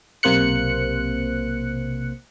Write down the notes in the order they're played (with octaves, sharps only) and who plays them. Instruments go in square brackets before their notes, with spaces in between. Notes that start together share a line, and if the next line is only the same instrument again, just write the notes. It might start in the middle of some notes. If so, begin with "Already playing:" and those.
[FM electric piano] B1 C3 A#3 C5 F#6 C#7